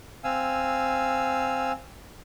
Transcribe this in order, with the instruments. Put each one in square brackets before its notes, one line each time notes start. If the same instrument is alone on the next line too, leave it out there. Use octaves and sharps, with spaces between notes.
[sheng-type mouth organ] C4 F5 G#5 E6